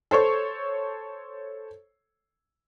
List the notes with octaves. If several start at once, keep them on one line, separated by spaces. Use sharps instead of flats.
A4 C5 C#5 C#6